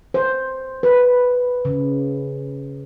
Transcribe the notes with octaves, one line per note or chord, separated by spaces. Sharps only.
C5
B4
C#3